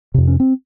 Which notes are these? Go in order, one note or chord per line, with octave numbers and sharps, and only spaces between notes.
F2 C3
C#4
C4